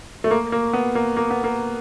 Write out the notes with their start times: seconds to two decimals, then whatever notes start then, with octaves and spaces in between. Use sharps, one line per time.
0.24 A3
0.31 A#3
0.52 A#3
0.73 B3
0.95 A#3
1.17 A#3
1.31 B3
1.44 A#3